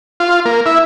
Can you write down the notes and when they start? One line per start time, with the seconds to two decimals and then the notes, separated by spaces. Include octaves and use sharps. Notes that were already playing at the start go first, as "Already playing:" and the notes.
0.20 F4
0.45 A#3
0.66 E4